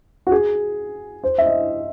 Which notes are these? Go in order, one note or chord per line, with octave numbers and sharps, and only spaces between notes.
F#4
G#4
C5
E5
D#5